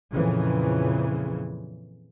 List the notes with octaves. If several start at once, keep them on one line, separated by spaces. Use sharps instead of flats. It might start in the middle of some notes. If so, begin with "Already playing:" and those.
F2 A#2 C#3 E3